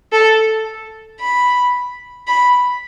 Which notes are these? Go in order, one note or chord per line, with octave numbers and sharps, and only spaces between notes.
A4
B5
B5